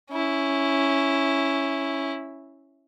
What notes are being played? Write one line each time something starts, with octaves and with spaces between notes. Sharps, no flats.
C#4 E4